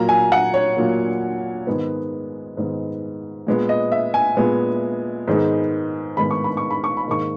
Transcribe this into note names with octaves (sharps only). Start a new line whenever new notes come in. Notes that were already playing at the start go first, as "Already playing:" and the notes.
Already playing: A#2 F#3 A#3 A#5
G#5
F#5
C#5
A#2 F#3 A#3
G#2 D#3 G#3 B3
G#2 D#3 G#3 B3
A#2 G#3 B3
D#5
E5
G#5
A#2 G#3 B3
G#2 D#3 G#3 B3
G#2 D#3 G#3 B3 B5
C#6
B5
C#6
B5
C#6
B5
G#2 D#3 A#3 C#6